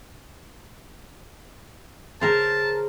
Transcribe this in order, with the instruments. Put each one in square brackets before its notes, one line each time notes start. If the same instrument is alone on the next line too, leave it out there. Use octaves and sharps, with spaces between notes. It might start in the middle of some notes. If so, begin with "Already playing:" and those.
[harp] C#3 G#4 G6 [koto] A#4 C5 [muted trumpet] A5